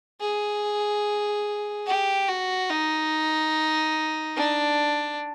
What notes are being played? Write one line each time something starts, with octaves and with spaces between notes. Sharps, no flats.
G#4
G4
F#4
D#4
D4